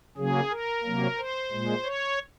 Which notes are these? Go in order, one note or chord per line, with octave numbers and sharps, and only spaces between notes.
C#3 F#3 A#3 G#4
A#4
C3 F#3 A#3
C5
A#2 G#3
C#5